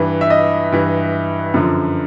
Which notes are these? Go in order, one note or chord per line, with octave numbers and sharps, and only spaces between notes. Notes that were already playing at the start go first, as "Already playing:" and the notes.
Already playing: G2 E3
E5
D#5
G2 E3
F#2 D3 F3